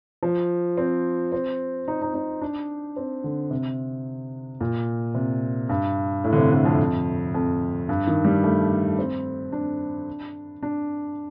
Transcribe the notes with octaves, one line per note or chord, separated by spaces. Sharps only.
F3
C4
C4
D#4
D#4
D#4
D4
C4
D3
C3
A#2
C3
G2
A2
D3
C3
D3
F2
F2
G2
D#3
G3
A3
C4
D4
D4